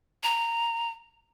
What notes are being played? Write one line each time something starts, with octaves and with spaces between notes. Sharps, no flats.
A#5